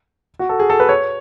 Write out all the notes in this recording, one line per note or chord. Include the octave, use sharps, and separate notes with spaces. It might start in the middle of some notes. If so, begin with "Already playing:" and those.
F#4
A4
G#4
A4
B4
C#5